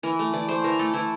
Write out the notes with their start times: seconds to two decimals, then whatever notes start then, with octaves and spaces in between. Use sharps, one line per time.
0.03 E3 A#4
0.19 A3
0.34 E3 D5
0.48 A3 C5
0.64 E3 A#4
0.79 A3 A4
0.94 E3 E4